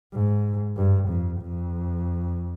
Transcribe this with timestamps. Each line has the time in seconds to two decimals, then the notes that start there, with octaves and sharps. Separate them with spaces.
0.14 G#2
0.77 G2
1.09 F2
1.42 F2